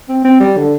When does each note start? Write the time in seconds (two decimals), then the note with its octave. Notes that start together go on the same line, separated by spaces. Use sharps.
0.09 C4
0.25 C4
0.40 G3
0.57 D3